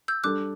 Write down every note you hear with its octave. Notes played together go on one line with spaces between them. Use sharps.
E6 G6
G3 D4 A4 D6 F#6